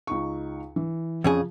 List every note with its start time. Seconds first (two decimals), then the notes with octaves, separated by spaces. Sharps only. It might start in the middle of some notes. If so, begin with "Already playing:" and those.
0.07 C#2 D#4 C#6
0.76 E3
1.24 F2 C#3 F3 G#4